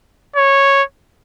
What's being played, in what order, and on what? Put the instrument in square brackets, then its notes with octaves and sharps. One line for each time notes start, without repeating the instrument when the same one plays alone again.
[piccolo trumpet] C#5